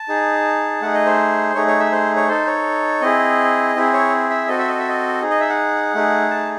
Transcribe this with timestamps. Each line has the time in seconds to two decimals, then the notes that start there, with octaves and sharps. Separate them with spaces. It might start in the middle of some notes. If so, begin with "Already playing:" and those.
Already playing: A5
0.09 D#4 G#4
0.82 A3 D#4 G#4 F#5
0.94 D#5
1.06 C5
1.55 A3 D#4 G#4 C#5
1.67 C#5
1.80 E5
1.92 C5
2.16 C#5
2.28 D#4 A4 C5
2.47 C#5
3.01 C4 E4 G#4 D#5
3.75 C4 E4 G#4
3.93 C#5
4.30 E5
4.48 C4 F#4 A4 D#5
4.59 E5
4.68 D#5
4.79 E5
4.89 D#5
5.21 D#4 G#4
5.30 D#5
5.40 E5
5.49 F#5
5.95 A3 D#4 G#4
6.31 A5